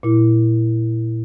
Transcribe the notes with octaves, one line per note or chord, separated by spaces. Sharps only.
A#2 E4